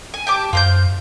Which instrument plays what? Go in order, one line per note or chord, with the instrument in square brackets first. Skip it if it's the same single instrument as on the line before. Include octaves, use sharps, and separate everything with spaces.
[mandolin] G#5
G4 A5 D6
[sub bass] F#2 [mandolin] F4 C5 G6